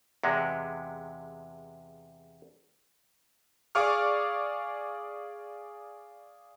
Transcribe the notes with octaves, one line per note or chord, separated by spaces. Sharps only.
E2 C3 G#3
G#4 D5 F5 C#6 D6 F6